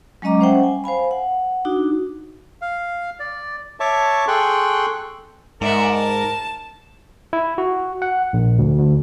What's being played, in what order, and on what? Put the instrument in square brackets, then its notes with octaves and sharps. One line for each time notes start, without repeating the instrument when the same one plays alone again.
[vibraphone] F#3 G#3 C#4 D#5 A#5 D6
G3 C#4 C5 E5 F#5 G5
G#5
C5 F5 G#5 B5
F#5
D4 D#4 F#4
[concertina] F5
D5
C#5 E5 A5 C#6 D6
G#4 A4 G5 C6 C#6 F#6
[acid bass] G#2 [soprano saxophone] A#4 [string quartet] D5 E5 F#5
[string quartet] A5
[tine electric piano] E4
F#4
F#5
A#1
D2
D2